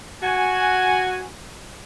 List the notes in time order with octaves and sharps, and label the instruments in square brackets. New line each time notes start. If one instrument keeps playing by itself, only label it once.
[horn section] F#4 G#5